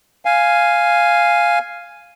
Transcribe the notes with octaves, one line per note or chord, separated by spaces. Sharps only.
F5 G#5